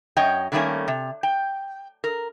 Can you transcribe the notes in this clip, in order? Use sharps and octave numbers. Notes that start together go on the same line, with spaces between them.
F#2 C#5 D#5 G5
D3 D#3 G3 A3 A#3 C#4
C3
G5
A#4